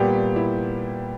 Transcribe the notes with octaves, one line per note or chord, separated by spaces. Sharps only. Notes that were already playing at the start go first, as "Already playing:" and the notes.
Already playing: A#2 G3 B3 G4
E4